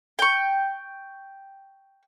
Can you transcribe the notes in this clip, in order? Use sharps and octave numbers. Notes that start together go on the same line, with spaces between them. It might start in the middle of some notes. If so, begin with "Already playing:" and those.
G5 C#6